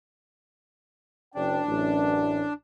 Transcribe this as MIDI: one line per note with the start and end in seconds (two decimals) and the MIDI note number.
1.35 1.59 30
1.35 2.53 62
1.35 1.59 79
1.66 2.44 33
1.66 2.44 42